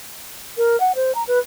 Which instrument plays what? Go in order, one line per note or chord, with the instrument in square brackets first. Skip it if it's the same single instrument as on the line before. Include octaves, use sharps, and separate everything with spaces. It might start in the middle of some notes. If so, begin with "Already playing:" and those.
[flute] A#4
F#5
C5
A#5
B4